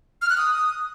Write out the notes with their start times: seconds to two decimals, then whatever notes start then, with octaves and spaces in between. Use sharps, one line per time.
0.22 F6
0.30 F#6
0.37 D#6